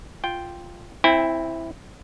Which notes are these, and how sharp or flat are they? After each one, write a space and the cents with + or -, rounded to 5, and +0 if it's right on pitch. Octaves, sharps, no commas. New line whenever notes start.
F4 +0 G5 +0
C4 +0 E4 +0 G5 +45